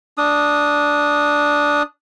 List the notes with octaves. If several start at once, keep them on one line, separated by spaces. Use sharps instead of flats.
D4 D#6